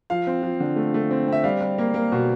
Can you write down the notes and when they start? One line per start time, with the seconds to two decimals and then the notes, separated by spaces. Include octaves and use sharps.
0.10 F3 F5
0.27 C4
0.43 F3
0.60 D3
0.76 A3
0.94 A3
1.11 C4
1.28 C4 E5
1.44 G3 F5
1.62 G3
1.78 A#3
1.94 A#3
2.12 B2